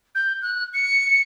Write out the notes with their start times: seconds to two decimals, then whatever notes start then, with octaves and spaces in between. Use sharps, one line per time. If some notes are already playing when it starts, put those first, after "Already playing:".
0.15 G6
0.42 F#6
0.73 C#7